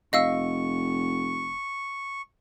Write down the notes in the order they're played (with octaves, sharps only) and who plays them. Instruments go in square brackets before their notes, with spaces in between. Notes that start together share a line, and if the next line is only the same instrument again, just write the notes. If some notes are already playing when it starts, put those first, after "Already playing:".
[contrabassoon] F1 [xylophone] D#5 F5 E6 [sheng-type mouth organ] C#6